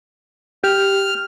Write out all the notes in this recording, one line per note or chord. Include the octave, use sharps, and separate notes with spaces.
G4 F6